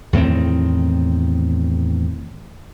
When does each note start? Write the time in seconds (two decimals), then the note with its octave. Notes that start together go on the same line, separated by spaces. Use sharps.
0.13 E2 A2 D#3 C4